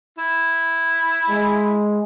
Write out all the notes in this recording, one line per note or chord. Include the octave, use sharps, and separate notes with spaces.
E4
G#3